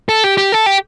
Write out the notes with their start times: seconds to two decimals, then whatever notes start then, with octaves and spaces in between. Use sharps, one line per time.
0.09 A4
0.24 G4
0.38 G4
0.52 A4
0.66 G4